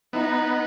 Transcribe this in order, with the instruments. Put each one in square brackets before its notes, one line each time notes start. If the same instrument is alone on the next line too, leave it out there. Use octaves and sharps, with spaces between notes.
[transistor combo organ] B3 [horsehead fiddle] D#4